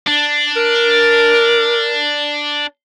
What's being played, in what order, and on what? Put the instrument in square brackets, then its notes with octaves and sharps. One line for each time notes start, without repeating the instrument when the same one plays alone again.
[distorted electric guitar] D4
[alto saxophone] A#4